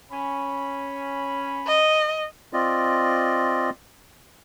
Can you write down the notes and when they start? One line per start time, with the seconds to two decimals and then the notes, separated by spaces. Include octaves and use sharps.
0.12 C#4 B5
1.67 D#5
2.53 C4 F4 D5 D#5